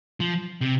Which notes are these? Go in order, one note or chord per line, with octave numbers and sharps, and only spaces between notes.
F3
C3